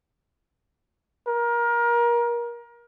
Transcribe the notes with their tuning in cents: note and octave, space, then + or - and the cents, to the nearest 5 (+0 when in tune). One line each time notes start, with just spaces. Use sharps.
A#4 +25